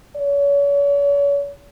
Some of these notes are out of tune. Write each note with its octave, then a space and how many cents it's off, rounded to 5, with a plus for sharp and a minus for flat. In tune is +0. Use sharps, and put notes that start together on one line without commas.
C#5 +40